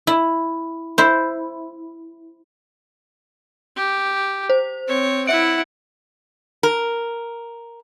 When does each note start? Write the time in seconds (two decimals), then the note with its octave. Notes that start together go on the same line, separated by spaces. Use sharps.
0.07 E4
0.98 E4 C5
3.76 G4
4.50 C5
4.87 C4 C#5
5.27 E4 E5 F#5 D7
6.63 A#4